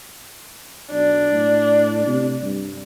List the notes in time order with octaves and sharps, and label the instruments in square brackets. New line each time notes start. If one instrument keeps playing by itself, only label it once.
[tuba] B1 [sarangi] D4
[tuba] A2
C3
G2